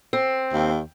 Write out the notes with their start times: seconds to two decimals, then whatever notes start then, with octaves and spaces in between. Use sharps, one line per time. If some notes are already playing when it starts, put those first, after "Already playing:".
0.13 C4
0.53 D#2